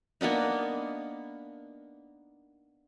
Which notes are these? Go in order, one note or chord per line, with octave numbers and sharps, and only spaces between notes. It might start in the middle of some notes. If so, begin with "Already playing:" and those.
A#3 B3 D4 D#4